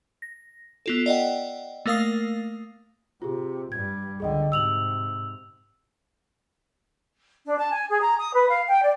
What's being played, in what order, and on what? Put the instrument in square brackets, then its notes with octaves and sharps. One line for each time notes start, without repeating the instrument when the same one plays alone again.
[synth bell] A#6
B3 F4 A4
D5 D#5 F#5 G5
A3 A#3 A#4 F5 D#6 C7
[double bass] C3 [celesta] F4 G4 G#4
[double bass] G2 G3 [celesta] G#6
[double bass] C#2 D3 [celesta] G#4 D#5 G5
[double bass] G#2 C3 [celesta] E6 F7 F#7
[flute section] D4
A5
G#5
G#4
A#5
D#6
B4
F5
G5
D5